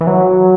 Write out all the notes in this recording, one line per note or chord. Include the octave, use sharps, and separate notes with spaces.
E3
F#3